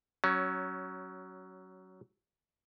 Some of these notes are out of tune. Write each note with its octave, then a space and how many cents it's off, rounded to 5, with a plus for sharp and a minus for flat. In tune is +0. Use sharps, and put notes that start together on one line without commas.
F#3 +15 C#4 +0